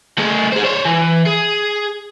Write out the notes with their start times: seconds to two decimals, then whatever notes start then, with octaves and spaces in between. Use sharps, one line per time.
0.18 A3 G#4
0.52 G#4 C5
0.64 C5 C#5
0.85 E3
1.26 G#4